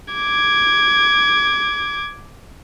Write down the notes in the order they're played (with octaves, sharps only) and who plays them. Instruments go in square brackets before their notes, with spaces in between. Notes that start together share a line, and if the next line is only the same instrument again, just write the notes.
[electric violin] D6 G#6